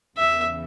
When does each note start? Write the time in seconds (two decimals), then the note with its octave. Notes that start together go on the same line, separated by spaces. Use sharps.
0.17 E2 C#3 E3 E5